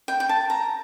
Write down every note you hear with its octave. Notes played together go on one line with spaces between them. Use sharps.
G5
G5
A5
A#5